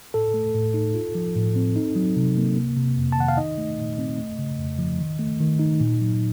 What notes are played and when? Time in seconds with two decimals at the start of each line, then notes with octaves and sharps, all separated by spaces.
0.14 A2 A4
0.34 A3
0.55 A2
0.74 D#4
0.95 F4
1.15 F3
1.36 A2
1.56 C4
1.76 D#4
1.96 F#3
2.16 C3
2.37 A#3
2.56 A#3
2.76 C3
2.97 F2
3.12 A5
3.18 D#3 F#5
3.28 F5
3.37 D#4 D#5
3.58 A3
3.78 A#2
3.98 C4
4.18 A3
4.39 C#3
4.59 F2
4.79 F3
4.99 D#3
5.19 A3
5.40 D#3
5.59 D#4
5.80 A#2
6.01 F#3